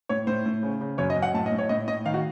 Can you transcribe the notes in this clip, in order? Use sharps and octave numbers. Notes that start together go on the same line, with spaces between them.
A2 C#5
A2 C5
A2
C#3
C#3
F#2 C#5
D#5
F#2
F#5
A2 A5
D#5
A2
C#5
A2 D#5
A2 D#5
D#3 F5
F#4